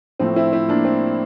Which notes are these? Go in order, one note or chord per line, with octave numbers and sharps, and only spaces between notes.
A2 F3 A3 C4
C4 E4
C4 E4
A#3 D4
C4